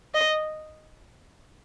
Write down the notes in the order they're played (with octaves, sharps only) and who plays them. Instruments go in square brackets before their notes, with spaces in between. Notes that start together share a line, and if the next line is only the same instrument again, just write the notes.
[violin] D#5